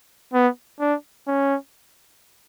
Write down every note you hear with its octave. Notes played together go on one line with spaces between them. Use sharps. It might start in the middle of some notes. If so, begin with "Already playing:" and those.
B3
D4
C#4